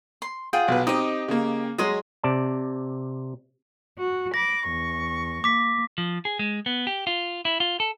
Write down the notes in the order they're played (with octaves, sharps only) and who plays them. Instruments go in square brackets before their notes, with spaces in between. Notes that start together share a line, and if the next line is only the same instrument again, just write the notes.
[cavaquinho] C6
[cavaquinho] F4 G#4 F#5 [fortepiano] G5
[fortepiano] B1 B4
[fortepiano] C4 D#4 [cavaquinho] G4 D#5
[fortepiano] C#3 A#3
[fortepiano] F#3 G#3 [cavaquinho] D#5 C6
[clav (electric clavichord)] C3 D5 A5
[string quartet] F#4
[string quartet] B5 D6 [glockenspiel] A#6
[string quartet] E2 C#6
[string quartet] A#3 [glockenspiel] D6 B6
[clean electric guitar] F3
G#4
G#3
B3
G4
F4
E4
F4
A4